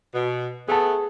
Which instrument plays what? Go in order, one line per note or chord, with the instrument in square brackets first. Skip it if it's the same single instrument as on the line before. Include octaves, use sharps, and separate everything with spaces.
[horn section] B2
[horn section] A3 B3 [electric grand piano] G#4 A5